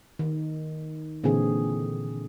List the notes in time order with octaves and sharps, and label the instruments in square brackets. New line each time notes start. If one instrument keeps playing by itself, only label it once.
[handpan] D#3
A#2 D3 E3 C4 G#4